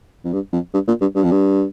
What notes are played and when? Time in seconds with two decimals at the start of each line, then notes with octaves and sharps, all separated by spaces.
0.25 F2
0.33 G2
0.53 F2
0.74 G2
0.88 A#2
1.01 G2
1.15 G2
1.23 F2
1.31 G2